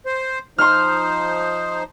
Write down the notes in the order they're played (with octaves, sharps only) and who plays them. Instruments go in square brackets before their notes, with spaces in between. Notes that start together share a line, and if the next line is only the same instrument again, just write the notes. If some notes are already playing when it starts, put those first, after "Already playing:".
[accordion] C5
[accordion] F3 D#4 C5 [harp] C6 F6